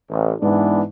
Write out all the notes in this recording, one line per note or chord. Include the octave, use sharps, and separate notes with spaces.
A1
G#2 E3 B3 D4